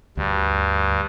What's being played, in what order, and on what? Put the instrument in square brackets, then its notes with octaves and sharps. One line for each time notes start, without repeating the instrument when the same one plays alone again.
[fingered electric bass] D2 [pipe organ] G2